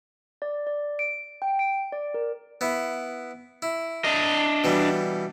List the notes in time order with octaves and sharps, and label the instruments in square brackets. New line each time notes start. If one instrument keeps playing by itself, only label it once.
[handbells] D5
D5
D7
G5
D7
D5
A#4
[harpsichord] B3 E4
E4
[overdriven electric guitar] D4 D#5
[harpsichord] B2 E3 G3